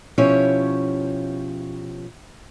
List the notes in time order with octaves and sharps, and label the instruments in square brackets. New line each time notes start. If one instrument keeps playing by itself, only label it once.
[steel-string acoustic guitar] B2 F3 C#4 E4 G4 C#5